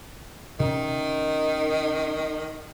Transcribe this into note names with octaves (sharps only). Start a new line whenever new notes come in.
C3 D#3 C#4